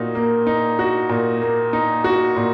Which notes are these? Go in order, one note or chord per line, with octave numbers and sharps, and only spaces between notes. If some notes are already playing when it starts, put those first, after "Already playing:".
Already playing: A#2 D#4 F#4
A#3
D#4
F#4
A#2
A#3
D#4
F#4
A#2